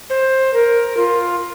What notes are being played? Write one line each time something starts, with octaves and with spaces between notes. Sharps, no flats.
C5
A#4
F4